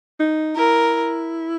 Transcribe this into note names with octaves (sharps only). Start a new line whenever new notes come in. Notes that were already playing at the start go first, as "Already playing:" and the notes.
D#4
E4 A#4